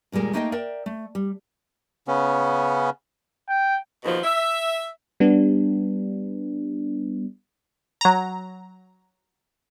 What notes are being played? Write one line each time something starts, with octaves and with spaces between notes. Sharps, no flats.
D#2 A#2 G3 G#3 A#4
A3 A#3 D#4 A4 D#5 G5
A#4 D5 E5 G5
A3
G3
C#3 B3 C#4
G5
D#2 B2 F3
E5
G3 B3 D4
F#3 A#5